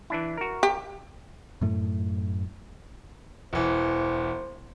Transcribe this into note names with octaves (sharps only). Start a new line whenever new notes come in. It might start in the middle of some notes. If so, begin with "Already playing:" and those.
E3 D4 E4
F#4 A#4
G4
F#2 A2 A3
E1 E3 C5